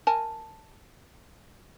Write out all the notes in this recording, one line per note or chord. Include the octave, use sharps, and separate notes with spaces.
A#4 G#5 A5